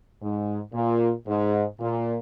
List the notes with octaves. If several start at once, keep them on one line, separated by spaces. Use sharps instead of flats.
G#2
A#2
G#2
A#2